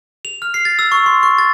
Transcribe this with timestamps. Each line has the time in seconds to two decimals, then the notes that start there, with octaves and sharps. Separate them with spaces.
0.25 F7
0.42 F6
0.54 C7
0.65 A6
0.79 E6
0.92 C#6
1.06 C6
1.23 C#6
1.38 A6